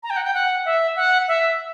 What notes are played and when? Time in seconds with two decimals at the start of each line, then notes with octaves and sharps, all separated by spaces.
0.03 A#5
0.10 G5
0.17 F#5
0.24 G5
0.34 F#5
0.65 E5
0.96 F#5
1.28 E5